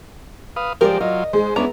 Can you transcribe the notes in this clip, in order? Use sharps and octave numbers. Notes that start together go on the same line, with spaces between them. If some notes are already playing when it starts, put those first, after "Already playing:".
B4 F5 D#6
F3 G#3 G4 A#4 C5 D5 G5
F#3 F4 D#5
G#3 C5
B3 C#4 D4 E4 A#5